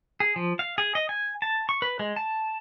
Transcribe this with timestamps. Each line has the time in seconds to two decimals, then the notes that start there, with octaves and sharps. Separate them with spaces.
0.20 G#4
0.36 F3
0.59 F5
0.78 G#4
0.95 D#5
1.09 G#5
1.42 A5
1.69 C#6
1.82 B4
1.99 G#3
2.16 A5